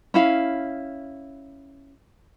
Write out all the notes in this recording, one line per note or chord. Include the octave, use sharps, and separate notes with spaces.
C#4 E4 F5